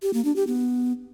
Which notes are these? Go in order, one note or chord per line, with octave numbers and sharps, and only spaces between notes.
G4
A#3
D4
G4
B3